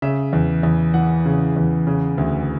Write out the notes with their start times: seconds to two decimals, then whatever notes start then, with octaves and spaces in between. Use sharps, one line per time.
0.02 C#3 E5
0.33 E2
0.63 E2
0.94 E3 F#5
1.26 C#3
1.56 E2
1.87 C#3
2.18 D2